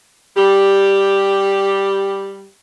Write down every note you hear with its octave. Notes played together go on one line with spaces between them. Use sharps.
G3 G4